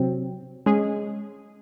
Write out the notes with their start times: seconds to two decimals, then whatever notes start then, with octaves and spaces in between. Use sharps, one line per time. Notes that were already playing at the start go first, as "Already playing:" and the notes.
Already playing: C3 F#3 C4
0.66 G#3 C#4 G#4